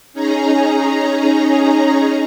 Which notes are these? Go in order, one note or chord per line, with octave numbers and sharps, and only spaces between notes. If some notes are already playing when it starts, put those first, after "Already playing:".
C#4 D#4 G#4 A#5